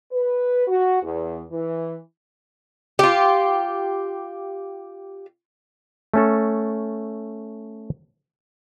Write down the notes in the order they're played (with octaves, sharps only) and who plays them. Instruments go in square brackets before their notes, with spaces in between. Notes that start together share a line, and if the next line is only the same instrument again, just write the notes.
[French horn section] B4
F#4
E2
E3
[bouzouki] F4 G4
[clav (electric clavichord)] A3 C#4 A4